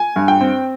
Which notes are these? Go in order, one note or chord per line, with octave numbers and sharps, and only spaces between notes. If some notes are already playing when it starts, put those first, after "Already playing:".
Already playing: G#5
G2
G5
C4